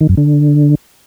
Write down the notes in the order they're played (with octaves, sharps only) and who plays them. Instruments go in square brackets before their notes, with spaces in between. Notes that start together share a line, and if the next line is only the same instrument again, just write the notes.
[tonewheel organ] D#3
F#2
D3